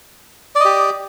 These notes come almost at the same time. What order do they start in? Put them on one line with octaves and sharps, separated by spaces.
D5 D#5 G4